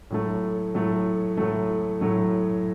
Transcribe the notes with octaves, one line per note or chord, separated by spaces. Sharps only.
A2 F#3 A3
A2 F#3 A3
A2 F#3 A3
A2 F#3 A3